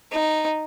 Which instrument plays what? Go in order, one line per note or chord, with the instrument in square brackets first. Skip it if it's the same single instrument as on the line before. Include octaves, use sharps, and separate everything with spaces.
[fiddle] D#4